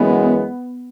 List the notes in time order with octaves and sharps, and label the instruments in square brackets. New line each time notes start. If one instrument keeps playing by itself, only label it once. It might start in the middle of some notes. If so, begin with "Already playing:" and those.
Already playing: [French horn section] F#2 E3 G#3 [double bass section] B3